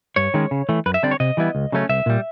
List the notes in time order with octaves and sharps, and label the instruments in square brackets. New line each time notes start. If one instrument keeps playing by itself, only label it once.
[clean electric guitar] G2 C#5
D#3 G#3 C#4
C#3
E3 A3
F#2 B4
E5
D3 G3 C4 D5
C#5
C3 D#5
E3 G3 B3 E4
C#2
C#3 F#3 A3 C#4
C2 E5
A#2 G3